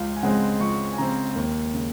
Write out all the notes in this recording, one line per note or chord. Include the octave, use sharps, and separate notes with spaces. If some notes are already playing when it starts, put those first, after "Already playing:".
Already playing: C#2 F5
G#5
C#3 G#3 C4 F#5
C#2 C#6
G#5
C#3 G#3 C4 A#5
D#2
C#3